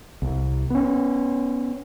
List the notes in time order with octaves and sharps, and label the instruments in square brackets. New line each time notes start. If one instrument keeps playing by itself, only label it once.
[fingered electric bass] C2
B3 C#4